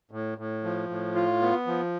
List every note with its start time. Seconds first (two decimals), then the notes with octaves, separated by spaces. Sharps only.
0.11 A2
0.38 A2
0.64 F3
0.89 A2
1.15 F4
1.41 B3
1.67 F3